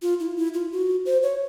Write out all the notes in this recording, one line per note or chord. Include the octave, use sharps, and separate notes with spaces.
F4
E4
E4
F4
F#4
C5
C#5